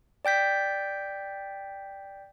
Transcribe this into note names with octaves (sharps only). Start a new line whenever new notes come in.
D5 G5 G6 B6